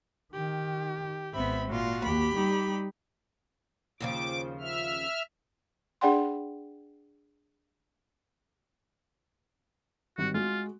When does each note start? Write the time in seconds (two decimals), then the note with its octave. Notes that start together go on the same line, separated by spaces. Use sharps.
0.34 D#3 G4
1.35 G#1 B3 C4 E5 B5
1.68 A#2 F4 F#4
2.03 D#2 G4 B5
2.35 G3 D#4
4.00 D#2 C#3 F3 D6
4.60 E5 F6
6.01 D4 G#4 D5 F#5 G5 C6
10.18 G#1 G3 F#4
10.34 G#3 F4 F#4